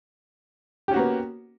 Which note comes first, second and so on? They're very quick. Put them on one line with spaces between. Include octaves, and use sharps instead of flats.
G4 C#4 F#4 A#3 B3